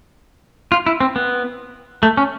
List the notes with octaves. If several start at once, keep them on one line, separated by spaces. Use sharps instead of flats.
F4
E4
C4
B3
A3
C#4